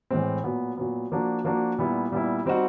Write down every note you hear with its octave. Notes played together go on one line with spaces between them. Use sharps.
A2 E3 G#3 C4
A#2 F#3 B3
A#2 F#3 B3
F3 A#3 D4 F#4
F3 A#3 D4 F#4
A#2 G3 B3 E4
A#2 G3 B3 E4
G3 C4 D#4 F#4